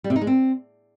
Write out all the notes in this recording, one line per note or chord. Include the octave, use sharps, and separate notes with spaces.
G3
C3
D#4
G#3
C4